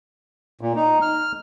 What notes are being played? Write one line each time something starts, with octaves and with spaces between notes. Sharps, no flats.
A#2
D#4
F6